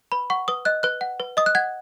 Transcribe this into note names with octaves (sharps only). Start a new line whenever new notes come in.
B4 B5
F#5 C#6
B4 D#6
D#5 F#6
B4 F#6
F#5
B4
D#5 D#6
F#6
F#5 G#6